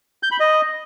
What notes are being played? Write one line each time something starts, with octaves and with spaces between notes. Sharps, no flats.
G6
B5
D#5